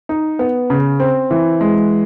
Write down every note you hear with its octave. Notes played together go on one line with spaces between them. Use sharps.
D#4
B3
C#3
C4
E3
G#3